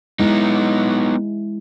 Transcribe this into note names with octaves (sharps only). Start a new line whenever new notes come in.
G#3 B3 D#4 E4